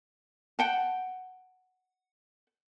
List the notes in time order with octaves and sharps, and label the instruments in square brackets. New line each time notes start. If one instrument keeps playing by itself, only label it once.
[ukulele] F#5 G5 A5